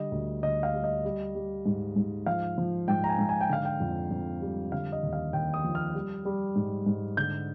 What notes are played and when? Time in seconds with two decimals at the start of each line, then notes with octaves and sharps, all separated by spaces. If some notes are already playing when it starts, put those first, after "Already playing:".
Already playing: D3 G3 D#5
0.12 D2
0.43 D2 D#5
0.63 F5
0.74 G3
0.84 D#5
1.05 G3
1.35 G3
1.66 G#2
1.96 G#2
2.26 F3 F5
2.58 F3
2.88 G#2 G5
3.04 A#5
3.09 G#5
3.19 G#2
3.29 G#5
3.41 G5
3.49 D3 F5
3.65 G5
3.80 F2
4.11 F2
4.42 G3
4.72 D3 F5
4.92 D#5
5.03 D#2
5.13 F5
5.33 D#2 G5
5.54 D#6
5.64 F3
5.75 F6
5.95 G3
6.25 G3
6.56 G#2
6.86 G#2
7.17 D3 G6